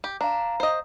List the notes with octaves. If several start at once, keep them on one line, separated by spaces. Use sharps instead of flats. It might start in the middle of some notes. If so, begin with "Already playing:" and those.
G4
D4 F5 A#5
C5 D#5